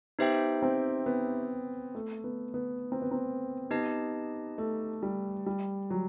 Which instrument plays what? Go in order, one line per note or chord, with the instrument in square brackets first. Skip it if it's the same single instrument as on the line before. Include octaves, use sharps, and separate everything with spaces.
[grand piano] B3 [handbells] D#4 G4 C5 E5 G5
[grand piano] C4
B3
A3
B3
B3
C4
B3
C4
[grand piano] B3 [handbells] D#4 G4 D#5 A5
[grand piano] A3
G3
G3
F#3